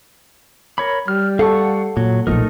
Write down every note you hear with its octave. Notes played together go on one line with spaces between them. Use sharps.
A#4 C#5 B5
G3 F6
A4 F5 F#5 C#6
A#2 F#3
B1 A#2 F3 A3 D#4 A#4